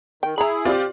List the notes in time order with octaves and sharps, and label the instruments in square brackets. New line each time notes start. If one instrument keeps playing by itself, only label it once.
[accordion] D#3 [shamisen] G5
[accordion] E4 G#4 [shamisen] A#5 B5
[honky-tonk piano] C4 F4 D5 [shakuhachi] G4